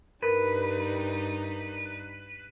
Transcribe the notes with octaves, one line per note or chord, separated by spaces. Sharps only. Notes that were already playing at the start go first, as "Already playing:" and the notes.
G2 G3 D#4 A#4 B4